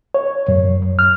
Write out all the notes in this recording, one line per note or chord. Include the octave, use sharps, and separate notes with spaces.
C#5
F#2
F6